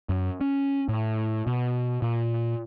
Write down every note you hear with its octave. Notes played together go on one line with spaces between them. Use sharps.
F#2
C#4
A2
B2
A#2